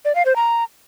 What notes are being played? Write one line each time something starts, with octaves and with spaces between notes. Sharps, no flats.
D5
F5
C5
A#5